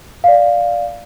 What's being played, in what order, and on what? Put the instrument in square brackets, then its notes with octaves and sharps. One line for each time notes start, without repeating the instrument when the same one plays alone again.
[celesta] D5 F5